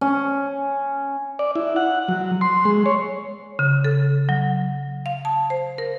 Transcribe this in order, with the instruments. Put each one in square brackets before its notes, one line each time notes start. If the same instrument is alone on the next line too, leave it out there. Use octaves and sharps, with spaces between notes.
[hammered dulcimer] C#4
[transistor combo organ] D5
E4
F#5
F#3
C6
G#3
C#5
[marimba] C#3
A4
F#3
F5
A5
C5
A#4